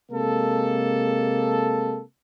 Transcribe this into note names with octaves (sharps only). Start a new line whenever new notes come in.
C3 G#3 A#3 A4